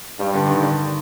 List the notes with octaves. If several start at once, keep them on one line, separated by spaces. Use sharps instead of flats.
G2 G3
D3
D#3
D3